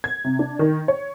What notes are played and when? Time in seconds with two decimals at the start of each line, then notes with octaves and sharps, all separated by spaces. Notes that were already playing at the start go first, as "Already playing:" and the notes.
0.04 G#6
0.24 C3
0.39 D4
0.59 D#3
0.88 C#5